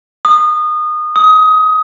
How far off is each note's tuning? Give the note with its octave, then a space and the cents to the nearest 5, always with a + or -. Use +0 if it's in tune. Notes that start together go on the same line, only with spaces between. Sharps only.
D#6 -25
D#6 +20